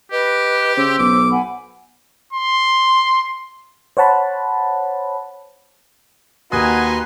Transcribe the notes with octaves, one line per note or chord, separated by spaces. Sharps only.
G4 B4 D#5
C#3 C5 E6
B1 D6
F#5 G#5 B5
C6
C5 C#5 F#5 A5 B5
D#2 F#4 B4 D#5 G#5 A#5 C6 D#6